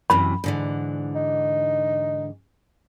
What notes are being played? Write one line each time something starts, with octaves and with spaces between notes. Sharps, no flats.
F#2 C3 E3 B5
G#2 D3 E3
D#4